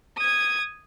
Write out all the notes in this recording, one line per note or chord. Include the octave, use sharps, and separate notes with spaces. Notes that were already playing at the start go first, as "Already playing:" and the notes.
D#6 G#6